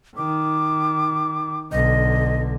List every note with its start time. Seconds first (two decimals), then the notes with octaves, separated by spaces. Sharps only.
0.17 D#3 D6
1.72 B1 D3 D#5